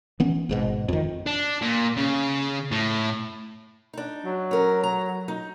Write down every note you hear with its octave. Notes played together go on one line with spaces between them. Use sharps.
E3 B3 C#4
G#1 G#2 B2
F2 D#3
D4
A#2
C#3
A2
D4 D#4
F#3
C#4 A#4
A#5
D#4